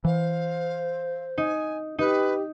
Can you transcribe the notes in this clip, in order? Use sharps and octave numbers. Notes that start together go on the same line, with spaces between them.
E3 C5 F5
D#4 G#5
D#4 G4 B4